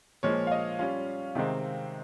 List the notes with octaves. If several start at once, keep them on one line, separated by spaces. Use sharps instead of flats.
A#2 F3 G#3 C#5
F5
D#5
G3 C#4 F4 F5
C3 D#3 G#3 C4